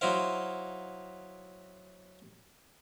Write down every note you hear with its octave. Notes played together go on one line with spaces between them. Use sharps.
F#3 D#4 E4 C5 F5